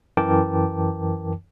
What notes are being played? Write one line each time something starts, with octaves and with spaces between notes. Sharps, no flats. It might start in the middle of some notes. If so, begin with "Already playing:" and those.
F#2 E3 A#4 G5 A5 D6